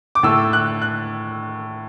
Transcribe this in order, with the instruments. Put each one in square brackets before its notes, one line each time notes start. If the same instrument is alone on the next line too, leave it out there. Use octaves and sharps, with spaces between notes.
[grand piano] D6
A2 A3 E6
F#6
F#6